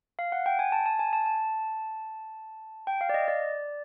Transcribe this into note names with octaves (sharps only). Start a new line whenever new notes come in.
F5
F#5
G5
G#5
A5
A5
G#5
A5
A5
G5
F5
D5
D#5
D5